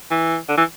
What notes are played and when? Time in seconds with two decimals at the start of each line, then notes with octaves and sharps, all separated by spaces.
0.11 E3
0.49 D3
0.57 E3